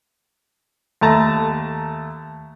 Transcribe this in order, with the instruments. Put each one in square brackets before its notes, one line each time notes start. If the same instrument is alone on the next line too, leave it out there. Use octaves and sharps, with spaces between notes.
[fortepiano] D#2 A3 A5 A#5